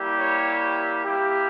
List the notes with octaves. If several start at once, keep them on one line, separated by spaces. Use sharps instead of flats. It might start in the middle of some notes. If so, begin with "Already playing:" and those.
Already playing: G3 A#3 E4 G4
C#5
A#3 E4 G4